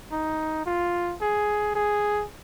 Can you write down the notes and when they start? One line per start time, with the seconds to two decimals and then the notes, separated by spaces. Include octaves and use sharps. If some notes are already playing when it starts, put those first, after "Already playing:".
0.12 D#4
0.66 F4
1.21 G#4
1.75 G#4